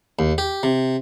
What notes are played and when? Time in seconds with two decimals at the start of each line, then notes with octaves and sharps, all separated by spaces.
0.19 D#2
0.38 G4
0.63 C3